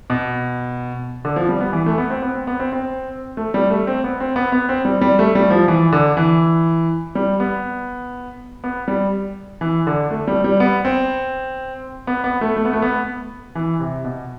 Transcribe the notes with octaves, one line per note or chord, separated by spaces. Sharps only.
B2
D3
F3
G3
B3
E3
A3
B3
C4
B3
C4
B3
C4
C4
A3
G3
A3
C4
B3
C4
B3
B3
C4
G3
G3
A3
G3
F3
E3
D3
E3
G3
B3
B3
G3
E3
D3
A3
G3
G3
B3
C4
B3
B3
A3
A3
B3
A3
B3
E3
C3
B2